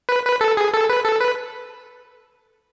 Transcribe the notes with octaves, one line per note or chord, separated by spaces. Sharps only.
B4
B4
A4
G#4
A4
B4
A4
B4